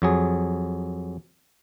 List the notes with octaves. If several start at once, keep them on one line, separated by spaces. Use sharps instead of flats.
F2 F#3 G#4